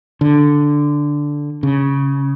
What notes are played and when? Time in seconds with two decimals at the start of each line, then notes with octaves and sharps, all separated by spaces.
0.21 D3
1.63 C#3